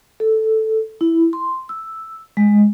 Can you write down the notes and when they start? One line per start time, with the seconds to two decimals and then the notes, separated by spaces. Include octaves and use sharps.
0.20 A4
1.01 E4
1.33 C6
1.69 E6
2.37 G#3